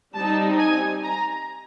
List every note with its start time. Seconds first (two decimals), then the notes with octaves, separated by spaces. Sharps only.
0.14 G3 C4 D#4 A5
0.58 G#5
1.03 A#5